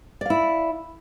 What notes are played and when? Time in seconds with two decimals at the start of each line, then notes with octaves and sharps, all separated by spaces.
0.21 D5
0.26 F5
0.30 E4